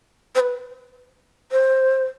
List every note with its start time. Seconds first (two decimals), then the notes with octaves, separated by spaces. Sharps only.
0.35 C5
0.40 B4
1.52 C5